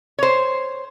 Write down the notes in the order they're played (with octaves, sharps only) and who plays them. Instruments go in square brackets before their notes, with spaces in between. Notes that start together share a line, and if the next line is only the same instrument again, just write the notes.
[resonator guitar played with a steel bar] C5 C#5